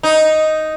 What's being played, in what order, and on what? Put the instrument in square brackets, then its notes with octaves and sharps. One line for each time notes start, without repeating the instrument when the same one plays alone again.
[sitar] D#4